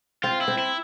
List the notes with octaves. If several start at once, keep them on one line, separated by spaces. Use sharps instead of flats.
C4 F4
E4
C4
E4